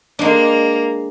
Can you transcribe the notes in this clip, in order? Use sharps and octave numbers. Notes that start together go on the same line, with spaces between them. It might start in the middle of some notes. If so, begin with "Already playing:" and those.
G#3 A#3 D4